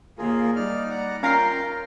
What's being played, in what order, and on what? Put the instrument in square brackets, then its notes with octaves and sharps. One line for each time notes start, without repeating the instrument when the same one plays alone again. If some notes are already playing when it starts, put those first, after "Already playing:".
[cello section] D#2 A#2 A#3 [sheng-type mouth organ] F4 G#4 A#4
[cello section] G3 [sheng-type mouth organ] D#4 D5 F6
[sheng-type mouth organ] D5 F#5 A#5
[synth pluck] C#4 A#6 C7 [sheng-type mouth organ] F4 G5 [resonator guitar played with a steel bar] A#4 F5 A#5